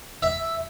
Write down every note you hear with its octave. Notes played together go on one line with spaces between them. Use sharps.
E5